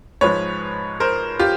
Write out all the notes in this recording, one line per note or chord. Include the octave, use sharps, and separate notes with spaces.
G#2 F3 G#3 B4 C#5
A#4 C5
F4 G4